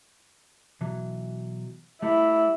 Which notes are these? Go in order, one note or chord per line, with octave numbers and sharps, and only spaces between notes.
B2 E3 F#3
G3 A3 E4